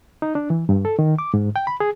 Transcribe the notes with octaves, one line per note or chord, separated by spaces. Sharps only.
D#4
D4
E3
G2
A4
D#3
D6
G#2
G5
B5
G#4